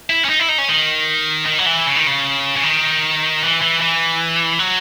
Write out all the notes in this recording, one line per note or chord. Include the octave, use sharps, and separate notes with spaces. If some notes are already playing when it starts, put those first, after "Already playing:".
E4
C#4
D#4
E4
D#4
C#4
D#3
D#3
F#3
E3
C#3
D#3
C#3
C#3
D#3
E3
E3
E3
F#3